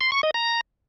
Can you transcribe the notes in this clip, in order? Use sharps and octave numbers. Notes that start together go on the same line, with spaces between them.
C6
C#6
D#5
A#5